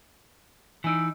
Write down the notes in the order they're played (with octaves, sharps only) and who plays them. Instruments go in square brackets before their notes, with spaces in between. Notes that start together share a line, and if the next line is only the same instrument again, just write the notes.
[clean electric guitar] E3 D#4 [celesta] G#5 E6 D7